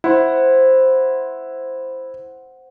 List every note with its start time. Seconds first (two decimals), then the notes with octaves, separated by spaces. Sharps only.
0.04 E4 C5 F#5